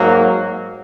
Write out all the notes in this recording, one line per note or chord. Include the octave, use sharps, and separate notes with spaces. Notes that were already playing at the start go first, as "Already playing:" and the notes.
Already playing: G#2 F#3 A#3